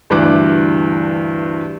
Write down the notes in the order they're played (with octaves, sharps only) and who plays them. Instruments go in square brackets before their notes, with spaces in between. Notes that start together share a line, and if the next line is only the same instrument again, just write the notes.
[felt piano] D2 G2 E3 D4 D6 F#6